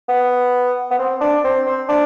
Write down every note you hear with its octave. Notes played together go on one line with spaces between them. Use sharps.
B3
B3
C4
D4
C4
C4
D4